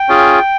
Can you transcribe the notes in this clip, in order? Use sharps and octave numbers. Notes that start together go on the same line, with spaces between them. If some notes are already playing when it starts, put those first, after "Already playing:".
Already playing: G5
C#4 F4 G#4